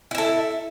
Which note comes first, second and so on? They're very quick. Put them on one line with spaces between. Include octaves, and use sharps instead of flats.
E4 E5 A4